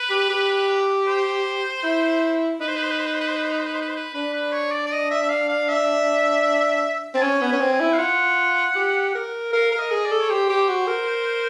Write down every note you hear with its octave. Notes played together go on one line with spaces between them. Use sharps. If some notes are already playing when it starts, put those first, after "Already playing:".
Already playing: B4
G4
G4
C5
E4
D#4 B4
C5
B4
C5
B4
C5
B4
C5
B4
C5
B4
C5
B4
C5
B4
C5
B4
C5
B4
D4 B4
B4
C#5
D5
D5
D#5
E5
E5
F5
F5
E5
C4 A5
C#4 G#5
B3
C#4 G#5
C4
G#5
E4
F5
F4 F#5
G4
A#4
A#4 F5
A#4
D#5
G#4
D5
A4
C#5
G4 C5
G4
F#4
A#4